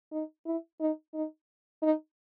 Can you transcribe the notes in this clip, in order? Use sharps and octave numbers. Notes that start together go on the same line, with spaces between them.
D#4
E4
D#4
D#4
D#4